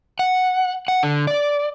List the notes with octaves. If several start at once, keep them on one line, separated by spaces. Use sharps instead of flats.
F#5
F#5
D3
D5